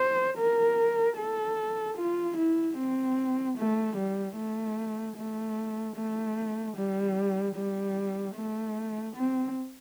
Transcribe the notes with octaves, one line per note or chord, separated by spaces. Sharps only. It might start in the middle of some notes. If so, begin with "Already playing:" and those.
Already playing: C5
A#4
A4
F4
E4
C4
A3
G3
A3
A3
A3
G3
G3
A3
C4